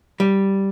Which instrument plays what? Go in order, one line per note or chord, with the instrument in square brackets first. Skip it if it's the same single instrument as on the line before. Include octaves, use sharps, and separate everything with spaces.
[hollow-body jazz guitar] G3